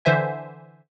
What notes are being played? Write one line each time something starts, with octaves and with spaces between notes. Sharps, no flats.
D3 E3 C5 E5 G#5